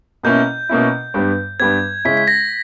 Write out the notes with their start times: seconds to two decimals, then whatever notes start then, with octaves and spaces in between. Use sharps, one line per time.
0.23 B2 A#3 C#4 E4 G6
0.69 B2 A#3 C#4 E4
1.14 G2 G3 B3
1.60 G2 G3 B3 G#6
2.05 C#3 G#3 C#4 E4 B6
2.17 B6
2.28 A#6